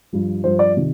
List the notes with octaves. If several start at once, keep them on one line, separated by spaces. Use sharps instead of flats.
G2 F3
G2 F3 C5
D5
C3 D#3